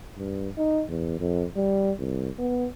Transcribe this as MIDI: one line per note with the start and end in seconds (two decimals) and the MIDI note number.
0.18 0.49 43
0.58 0.83 63
0.89 1.19 40
1.20 1.45 41
1.56 1.92 55
1.99 2.29 36
2.39 2.67 59